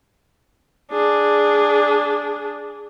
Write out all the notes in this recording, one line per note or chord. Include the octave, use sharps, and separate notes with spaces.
D4 G#4